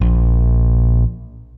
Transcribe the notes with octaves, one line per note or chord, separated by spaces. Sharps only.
A#1